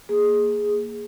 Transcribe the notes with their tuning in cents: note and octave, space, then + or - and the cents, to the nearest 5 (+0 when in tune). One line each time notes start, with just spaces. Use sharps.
A#3 +0 G#4 +0